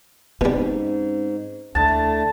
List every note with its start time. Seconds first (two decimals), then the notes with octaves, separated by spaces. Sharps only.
0.41 G#2 B2 G3 C4 C#4
1.75 D2 A3 D4 E4 A5